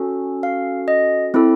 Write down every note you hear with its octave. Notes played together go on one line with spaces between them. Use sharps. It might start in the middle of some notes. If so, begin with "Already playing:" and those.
Already playing: C#4 F#4 A4
F5
D#5
C4 E4 A4